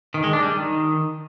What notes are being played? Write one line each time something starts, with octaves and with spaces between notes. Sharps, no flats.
D#3
G#3
D4
G3
D#3